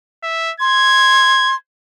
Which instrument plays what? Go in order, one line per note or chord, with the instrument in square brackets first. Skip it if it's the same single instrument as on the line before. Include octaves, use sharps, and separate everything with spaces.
[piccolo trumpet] E5
[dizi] C6 [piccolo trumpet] G#6